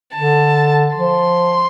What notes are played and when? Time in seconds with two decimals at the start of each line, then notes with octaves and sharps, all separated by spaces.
0.15 D3 A5
0.96 F3 C6